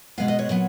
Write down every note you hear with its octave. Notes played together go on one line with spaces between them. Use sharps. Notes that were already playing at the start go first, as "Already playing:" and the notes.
B2 G#3 B3 F5
D#5
C#5
A#2 F#3 B3